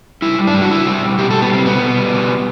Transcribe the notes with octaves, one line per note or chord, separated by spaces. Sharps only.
G3 E4
G3
D4
G3
F#4
G3 E4
G3
B2
B2 G4
G3 A4
B3
G3 C4
B2 B3
B2
G3
B2